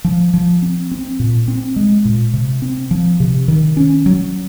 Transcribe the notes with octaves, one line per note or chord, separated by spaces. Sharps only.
F3
F3
C4
C4
A#2
C4
G#3
A#2
C3
C4
F3
C3
D#3
C#4
F#3